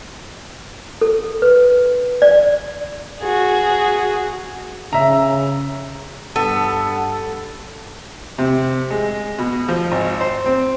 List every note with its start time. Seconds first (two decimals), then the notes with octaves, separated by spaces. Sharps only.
1.01 A4
1.42 B4
2.22 D5
3.22 F#4 G#4
4.93 C#3 E5 A#5
6.36 G2 B3 A4 A5
8.38 C3
8.91 G#3
9.38 B2
9.68 F3
9.92 G#1
10.21 C5
10.46 C4